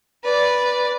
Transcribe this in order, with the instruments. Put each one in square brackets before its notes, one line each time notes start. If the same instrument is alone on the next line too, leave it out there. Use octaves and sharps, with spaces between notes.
[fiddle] B4 D5